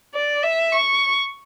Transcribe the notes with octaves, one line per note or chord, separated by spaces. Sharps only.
D5
E5
C#6